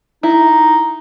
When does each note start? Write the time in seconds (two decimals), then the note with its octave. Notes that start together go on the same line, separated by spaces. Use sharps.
0.23 D#4 E4